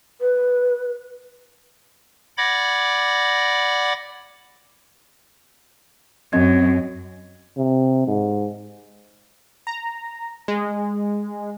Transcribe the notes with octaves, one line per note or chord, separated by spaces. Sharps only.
B4
D5 F#5 B5 D6 G#6 A#6
F#2 C4 D#5 G#6
C3
G#2
A#5
G#3